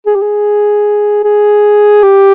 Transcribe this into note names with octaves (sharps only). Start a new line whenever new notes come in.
G#4
G4
G#4
G#4
G4